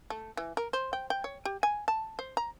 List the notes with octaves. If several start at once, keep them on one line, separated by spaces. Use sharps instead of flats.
A3
E3
A#4
C5
G5
G5
C#5
G4
G#5
A5
C5
A#5